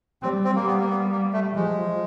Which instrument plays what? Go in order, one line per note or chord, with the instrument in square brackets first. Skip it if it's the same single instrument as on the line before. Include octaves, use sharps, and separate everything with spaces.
[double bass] G3 [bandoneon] C4
[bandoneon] C4
[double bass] G3 [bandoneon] A#3
[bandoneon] B3
A#3
B3
A#3
A3
[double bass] F3 [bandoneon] G#3